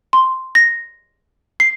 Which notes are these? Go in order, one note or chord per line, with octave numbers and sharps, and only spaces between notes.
C6
A#6
C7